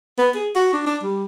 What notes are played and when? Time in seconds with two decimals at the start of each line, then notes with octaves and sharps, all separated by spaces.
0.18 B3
0.35 G#4
0.56 F#4
0.73 D4
0.87 D4
1.03 G3